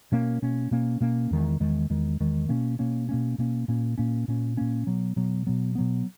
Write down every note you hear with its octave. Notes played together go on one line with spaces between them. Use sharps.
B2 A#3 C#4
B2 A#3 C#4
B2 A#3 C#4
B2 A#3 C#4
E2 D#3 G#3
E2 D#3 G#3
E2 D#3 G#3
E2 D#3 G#3
B2 A#3 C#4
B2 A#3 C#4
B2 A#3 C#4
B2 A#3 C#4
A#2 A#3 C#4
A#2 A#3 C#4
A#2 A#3 C#4
A#2 A#3 C#4
B2 F#3 B3
B2 F#3 B3
B2 F#3 B3
B2 F#3 B3